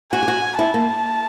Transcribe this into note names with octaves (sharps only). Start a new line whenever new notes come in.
F#4 G#5
G4
F#4
E4 A5
A#3